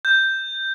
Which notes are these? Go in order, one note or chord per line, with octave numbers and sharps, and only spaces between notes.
G6